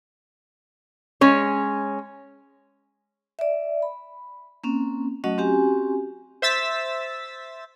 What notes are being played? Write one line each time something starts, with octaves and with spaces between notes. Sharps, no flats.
G#3 C#4 C#5
D5 E5
B5
A#3 C4 C#4
F#3 A3 C#4 F#4 D#5 F#5
C4 C#4 F#4 G4 G#5
C5 E5 E6 A6 B6